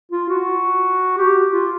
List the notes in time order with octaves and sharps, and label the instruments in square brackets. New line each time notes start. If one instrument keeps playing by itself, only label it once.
[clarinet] F4
F#4
G4
F4